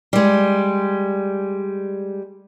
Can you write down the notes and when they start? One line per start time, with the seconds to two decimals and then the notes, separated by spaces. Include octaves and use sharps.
0.13 G3 G#3